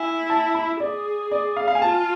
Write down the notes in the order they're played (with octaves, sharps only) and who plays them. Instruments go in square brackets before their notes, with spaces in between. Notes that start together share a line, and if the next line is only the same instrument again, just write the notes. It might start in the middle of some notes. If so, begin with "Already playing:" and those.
Already playing: [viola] E4 [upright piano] G#5
[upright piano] A5
B5
[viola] G#4 [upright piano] D5
[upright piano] D5
F5
F5
G#5
[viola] F4 [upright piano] A5